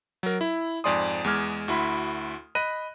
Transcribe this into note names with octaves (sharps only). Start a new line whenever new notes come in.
F#3 A#4
E4
F2 G#2 D5 G#5 C6 D#6
E2 G#3 D6 F6 G#6
D2 E4 F#4 B5 C6
D#5 B5 F#6 A#6 D#7